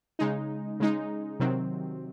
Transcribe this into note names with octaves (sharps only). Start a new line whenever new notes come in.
C#3 G#3 D#4
C#3 G#3 D#4
C3 D#3 F#3 C4